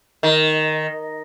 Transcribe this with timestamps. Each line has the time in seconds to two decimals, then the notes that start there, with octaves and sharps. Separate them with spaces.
0.23 D#3